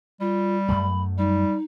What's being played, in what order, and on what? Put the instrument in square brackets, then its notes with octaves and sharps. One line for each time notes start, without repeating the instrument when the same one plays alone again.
[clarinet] G3 [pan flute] F4
[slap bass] F#2 F#3 A3 [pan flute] B5
[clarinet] G3 [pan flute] D#4